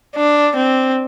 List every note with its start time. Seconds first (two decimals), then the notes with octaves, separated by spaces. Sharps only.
0.16 D4
0.56 C4